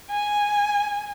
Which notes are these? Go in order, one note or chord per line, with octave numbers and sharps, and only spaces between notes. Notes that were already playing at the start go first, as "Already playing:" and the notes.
G#5